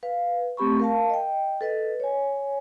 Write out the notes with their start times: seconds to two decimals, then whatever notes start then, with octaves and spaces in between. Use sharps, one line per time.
0.03 B4 F5
0.57 A3 C4 G4 B5 C#6
0.80 A#4 F5 A5
1.10 D#5 G5
1.61 A4 B4 D#5
2.00 C#5 G#5